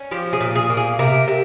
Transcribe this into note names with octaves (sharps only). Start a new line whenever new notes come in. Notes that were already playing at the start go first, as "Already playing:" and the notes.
Already playing: C#4
F3 G4
G#4
A#2
G#4
A#3
G#4
C3 A#4
C3